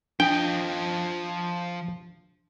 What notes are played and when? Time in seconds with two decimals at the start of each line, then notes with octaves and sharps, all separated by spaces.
0.20 F3 D4 D#5 G5